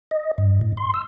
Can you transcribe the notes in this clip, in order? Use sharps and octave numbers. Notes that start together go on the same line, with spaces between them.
D#5
G2
A2
C6
E6